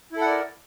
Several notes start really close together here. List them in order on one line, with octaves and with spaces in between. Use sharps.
E4 A4 F#5 D5 A#4